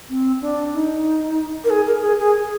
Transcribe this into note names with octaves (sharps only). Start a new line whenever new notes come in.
C4
D4
D#4
A#4
G#4
A#4
G#4
G#4